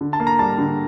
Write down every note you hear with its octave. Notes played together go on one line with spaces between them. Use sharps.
D3
A5
A#3
A#5
G3 A5
D3